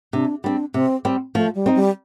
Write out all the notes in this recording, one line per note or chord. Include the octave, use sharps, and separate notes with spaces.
C3 D4
G3 C4 D4
C3 C4
G3 C4
F3 A3
G3
C4 D#4
G3